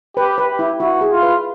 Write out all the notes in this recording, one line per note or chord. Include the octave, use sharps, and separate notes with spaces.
G4 B4
B4
G4
E4
E4 F#4
G#4
F4
B4